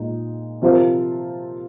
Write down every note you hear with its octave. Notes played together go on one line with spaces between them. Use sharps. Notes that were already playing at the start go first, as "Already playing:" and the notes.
Already playing: A#2 G#3 D#4
C3 F3 C4 F4 A#4